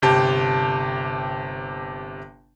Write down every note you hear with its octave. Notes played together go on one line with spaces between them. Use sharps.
G1 C3 G4 A5